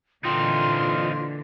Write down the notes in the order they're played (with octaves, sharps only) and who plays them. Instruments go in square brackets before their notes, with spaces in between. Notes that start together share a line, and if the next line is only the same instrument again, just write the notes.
[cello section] A#2 D3 E3 [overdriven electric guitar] C4 D#4 [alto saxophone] F4 [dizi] C6